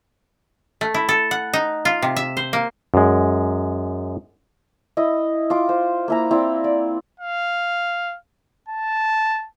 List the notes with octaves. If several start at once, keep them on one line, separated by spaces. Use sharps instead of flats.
A3
E4
A4
F#5
D#4
F4
C3
E5
C5
A#3
F#2 G#3
E4 D#5
F4 D6
C5
A#3 E4 A#5
C4 E4 D5
D5
F5
A5